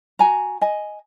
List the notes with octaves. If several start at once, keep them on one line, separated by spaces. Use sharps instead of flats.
F#4 G#5 A#5
D#5 G#5